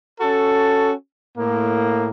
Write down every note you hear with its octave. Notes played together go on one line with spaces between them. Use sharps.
C#4 F#4 A4
A2 A#3